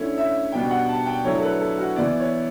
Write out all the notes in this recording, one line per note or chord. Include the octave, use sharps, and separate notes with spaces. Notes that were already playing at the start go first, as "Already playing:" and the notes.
Already playing: D3 A3 C#4 E4 C#5
E5
B2 G3 B3 D4 G5
F#5
A5
G5
D3 F#3 A3 E4 C#5
A4
B4
A4
F#4
E3 B3 E4 D5
C#5